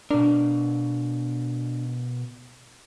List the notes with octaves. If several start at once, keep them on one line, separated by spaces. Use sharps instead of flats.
B2 D4 A#4